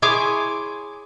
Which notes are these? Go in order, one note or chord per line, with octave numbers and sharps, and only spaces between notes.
E4 G#4 C#5 G#5 C6 D6